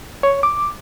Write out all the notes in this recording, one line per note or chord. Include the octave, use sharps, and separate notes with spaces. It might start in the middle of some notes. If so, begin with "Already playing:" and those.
C#5
D6